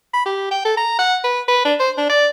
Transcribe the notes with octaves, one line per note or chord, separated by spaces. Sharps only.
B5
G4
G5
A4
A#5
F#5
B4
B4
D4
C5
D4
D5